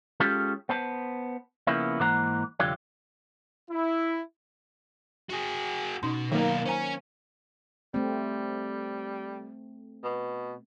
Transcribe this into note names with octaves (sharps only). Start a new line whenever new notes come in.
G#3 C#4 F4 G4 A4
B3 C5 A5
C#3 F3 A#3 B3 C#4 E4
G#2 E3 A#3 C5 F#5 A#5
C2 F2 D3 F4 G4 C#5
E4
F#4 G#4
B2 C#4 D#4 C6
B2 D#3 F#3 A#3 A#4
C#4 C5 G#5 A#5
G3 A3 C4
B2